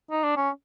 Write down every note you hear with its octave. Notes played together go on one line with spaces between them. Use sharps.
D#4
D4
C#4